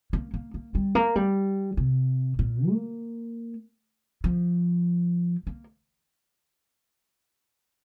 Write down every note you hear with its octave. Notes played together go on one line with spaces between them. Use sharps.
A#3
A#3
A#3
G3
A#3
G3
C3
A#2
A#3
F3
A#3